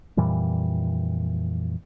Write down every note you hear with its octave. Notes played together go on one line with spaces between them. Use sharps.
F2 A#2 E3 G3